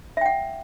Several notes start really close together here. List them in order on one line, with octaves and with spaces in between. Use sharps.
E5 G5 F#5